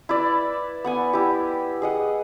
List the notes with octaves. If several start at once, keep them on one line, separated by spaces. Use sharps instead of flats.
E4 B4 D5
B3 F#5 G#5
E4 G4
G#4 D#5 F#5